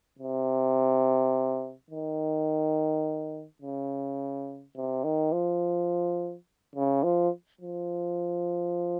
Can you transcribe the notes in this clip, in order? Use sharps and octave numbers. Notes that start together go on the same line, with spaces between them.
C3
D#3
C#3
C3
D#3
F3
C#3
F3
F3